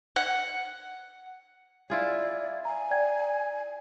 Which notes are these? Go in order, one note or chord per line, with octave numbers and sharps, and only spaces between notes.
F#5
E4 F4 G#4 D5
G#5 A#5
D5 G5 G#6